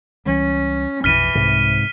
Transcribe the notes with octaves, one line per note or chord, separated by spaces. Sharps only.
C#2 E3 G3 C#4
A#1 F2 B2 E3 F6 B6 D#7
C2 G#2 C3